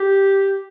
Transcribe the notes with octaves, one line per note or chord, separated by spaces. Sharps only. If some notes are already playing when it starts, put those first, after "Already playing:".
Already playing: G4